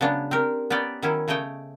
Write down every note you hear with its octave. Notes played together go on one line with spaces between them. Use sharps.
C#3 F#3 G#3 B3 D4
C4 G4 A#4
B3 C#4 D#4 D5 G5
D#3 F#3 C#4 E4
C#3 A3 C#5 D#5 G5